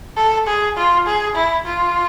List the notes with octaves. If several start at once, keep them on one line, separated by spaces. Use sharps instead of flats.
A4
G#4
F4
G#4
E4
F4